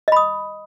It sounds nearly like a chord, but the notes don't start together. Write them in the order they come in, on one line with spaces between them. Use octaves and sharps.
D#5 B5 D#6